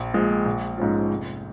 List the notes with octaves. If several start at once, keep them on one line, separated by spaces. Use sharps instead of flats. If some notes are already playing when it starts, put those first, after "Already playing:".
Already playing: A#1
A#2 F3 G#3
A#1
G#2 F3 C#4 F4
F1